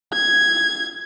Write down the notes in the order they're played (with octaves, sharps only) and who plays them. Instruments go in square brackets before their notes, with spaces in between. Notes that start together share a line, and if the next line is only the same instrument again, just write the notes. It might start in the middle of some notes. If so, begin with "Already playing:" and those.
[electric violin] G#6